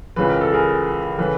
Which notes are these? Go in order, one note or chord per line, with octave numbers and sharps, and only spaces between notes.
C#2 C#3 E3 B4
A#4
A4
G#4 A#4
C#3 E3 A4 B4